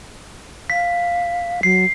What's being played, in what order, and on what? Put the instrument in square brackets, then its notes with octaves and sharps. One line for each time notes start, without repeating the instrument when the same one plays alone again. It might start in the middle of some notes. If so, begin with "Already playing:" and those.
[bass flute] F5 [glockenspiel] B6
[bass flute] F#3 [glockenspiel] C7